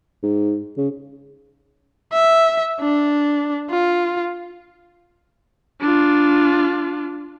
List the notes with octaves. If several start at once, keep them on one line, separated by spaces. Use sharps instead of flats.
G#2
C#3
E5
D4
F4
D4 F4